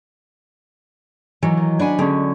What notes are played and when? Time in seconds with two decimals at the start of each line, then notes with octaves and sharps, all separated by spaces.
1.42 D#3 E3 F#3
1.57 D#3
1.79 D4 F#5 G#5 B5
1.99 D3 G#3 C#4